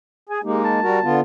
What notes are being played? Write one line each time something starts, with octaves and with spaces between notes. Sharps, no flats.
G#4 G#5
G#3 A#3 D#4 G4
A5
G3 F#4 A#4
D3 B3 F4